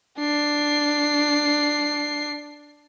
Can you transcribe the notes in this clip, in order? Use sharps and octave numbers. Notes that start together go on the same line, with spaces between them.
D4 C7